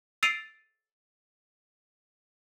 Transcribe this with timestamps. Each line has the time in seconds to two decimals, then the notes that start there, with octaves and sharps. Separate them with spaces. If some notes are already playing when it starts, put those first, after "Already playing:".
0.23 E6 A6 C7 D7 D#7 F7